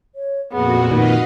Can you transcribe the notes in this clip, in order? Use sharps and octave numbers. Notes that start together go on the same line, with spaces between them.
C#5
F2 A#2 B3 F#4 G#4
A#2 D#3 B4 D#5 F5 F#5